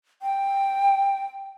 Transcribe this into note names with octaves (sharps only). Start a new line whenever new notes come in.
G5